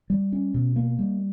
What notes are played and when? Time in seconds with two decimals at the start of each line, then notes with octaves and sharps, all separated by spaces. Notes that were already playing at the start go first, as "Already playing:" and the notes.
0.10 G3
0.33 C#4
0.54 B2
0.76 A#3
0.99 G3